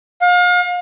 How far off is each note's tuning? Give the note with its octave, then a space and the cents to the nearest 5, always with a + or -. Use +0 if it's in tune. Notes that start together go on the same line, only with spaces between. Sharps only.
F5 +35